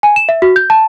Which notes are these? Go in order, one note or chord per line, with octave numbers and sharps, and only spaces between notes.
G#5
E7
E5
F#4
G6
A5